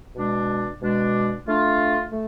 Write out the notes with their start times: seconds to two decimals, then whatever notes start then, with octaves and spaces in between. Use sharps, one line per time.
0.15 B2 G#3 D4
0.81 B2 G#3 D4
1.47 A3 D4 F4
2.12 A3